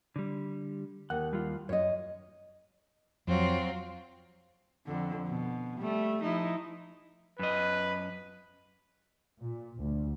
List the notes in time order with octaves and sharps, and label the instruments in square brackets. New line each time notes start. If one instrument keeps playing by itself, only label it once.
[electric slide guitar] D3 G3
[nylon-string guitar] D#2 [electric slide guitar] F#5
[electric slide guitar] G3 F4
[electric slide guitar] F#2 [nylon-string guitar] C#5 D#5
[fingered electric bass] F2 [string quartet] F#3 C4 F4
[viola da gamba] F2 D3
B2
G3 A3
F3 D#4 E4
[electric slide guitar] F#2 D#5 [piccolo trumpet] B4
[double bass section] A#2
D2